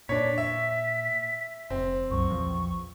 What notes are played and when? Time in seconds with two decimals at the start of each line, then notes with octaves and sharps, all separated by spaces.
0.09 A#2 D4 C#5 B6
0.38 E5
1.70 F1 C4
2.11 C2 F#2 F#3 C#6
2.28 A#1 E2 F3